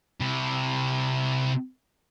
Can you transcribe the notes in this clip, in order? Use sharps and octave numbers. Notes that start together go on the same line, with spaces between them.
C3 E4